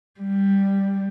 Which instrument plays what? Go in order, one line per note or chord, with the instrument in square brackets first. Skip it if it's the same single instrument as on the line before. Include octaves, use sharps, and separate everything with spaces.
[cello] G3